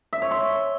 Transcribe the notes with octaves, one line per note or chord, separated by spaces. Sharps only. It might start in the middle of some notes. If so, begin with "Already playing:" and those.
E5
C#5
C6